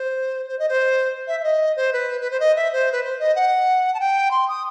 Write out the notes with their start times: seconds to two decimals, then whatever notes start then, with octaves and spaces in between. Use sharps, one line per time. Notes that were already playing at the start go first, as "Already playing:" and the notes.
Already playing: C5
0.48 C5
0.59 D#5
0.69 C5
1.28 E5
1.40 E5
1.44 D#5
1.76 C5
1.93 B4
2.21 B4
2.31 C5
2.40 D#5
2.56 E5
2.72 C5
2.92 B4
3.04 C5
3.20 D#5
3.36 F#5
3.94 A5
4.00 G5
4.31 C6
4.48 D#6